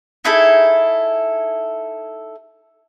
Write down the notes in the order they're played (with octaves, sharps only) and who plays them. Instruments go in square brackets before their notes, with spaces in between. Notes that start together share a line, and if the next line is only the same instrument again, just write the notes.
[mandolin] D#4 E4 G#4 A4